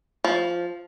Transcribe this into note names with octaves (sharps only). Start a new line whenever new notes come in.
F3